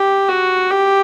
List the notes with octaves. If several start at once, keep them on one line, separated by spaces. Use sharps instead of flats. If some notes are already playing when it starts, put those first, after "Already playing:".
Already playing: G4
F#4
G4